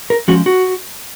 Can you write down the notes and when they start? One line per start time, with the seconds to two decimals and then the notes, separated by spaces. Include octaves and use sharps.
0.10 A#4
0.28 F3 G#3 C#4 F#4
0.46 F#4